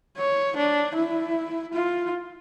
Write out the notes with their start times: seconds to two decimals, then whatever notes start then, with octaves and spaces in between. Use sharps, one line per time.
0.18 C#5
0.57 D4
0.95 E4
1.74 F4